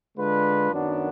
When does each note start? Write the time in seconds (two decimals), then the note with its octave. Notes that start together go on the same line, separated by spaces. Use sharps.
0.18 D3 G#3 D4 F4 B4
0.72 F#2 D#3 F#3 B3 D4